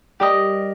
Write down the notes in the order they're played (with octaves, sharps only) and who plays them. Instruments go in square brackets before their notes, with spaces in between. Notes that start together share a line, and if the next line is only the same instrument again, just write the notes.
[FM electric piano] G3 [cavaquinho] G4 A#4 D#5